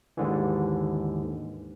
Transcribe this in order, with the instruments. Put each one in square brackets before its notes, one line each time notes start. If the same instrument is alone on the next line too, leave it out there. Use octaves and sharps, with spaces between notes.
[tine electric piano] D#2 G#2 D3 E3